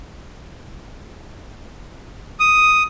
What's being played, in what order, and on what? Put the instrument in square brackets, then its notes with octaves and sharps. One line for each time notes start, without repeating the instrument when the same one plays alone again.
[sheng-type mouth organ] D#6